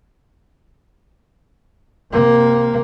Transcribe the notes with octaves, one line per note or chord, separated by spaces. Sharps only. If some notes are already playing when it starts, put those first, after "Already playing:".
C3 A#3